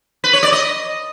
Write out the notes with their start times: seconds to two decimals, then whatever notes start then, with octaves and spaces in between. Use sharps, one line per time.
0.24 B4
0.33 C#5
0.43 D5
0.52 D#5